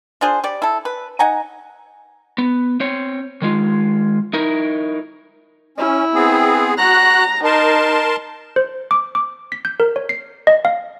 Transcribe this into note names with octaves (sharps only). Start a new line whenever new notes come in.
D4 F4 G#4 C5
G3 D5
E4 A4
B4
D#4 F#5 G#5 A#5
B3
C4 C#5
D#3 G#3 F4
D#4 E4 A#4
C#4 E4
B3 C4 G#4
F#4 A#5 F#6
D#4 A#4 A5 C6
C5
D6
D6
B6
G6
A#4
C#5
C7
D#5
F5